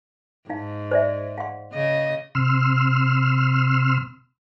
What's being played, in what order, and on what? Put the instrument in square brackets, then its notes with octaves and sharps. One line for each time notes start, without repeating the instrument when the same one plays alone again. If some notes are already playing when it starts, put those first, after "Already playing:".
[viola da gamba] G#2 [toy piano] D#4 F5
[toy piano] C5 D5 E5
F5 F#5 C6
[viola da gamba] C#3 D#5
[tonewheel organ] C3 C6 E6 F6